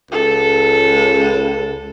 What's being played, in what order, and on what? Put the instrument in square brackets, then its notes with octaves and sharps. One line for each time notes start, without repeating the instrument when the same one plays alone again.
[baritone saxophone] C#2 [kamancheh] A4